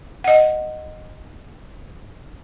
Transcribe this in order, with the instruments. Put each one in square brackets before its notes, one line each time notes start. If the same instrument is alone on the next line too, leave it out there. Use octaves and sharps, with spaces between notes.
[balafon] D#5 F#5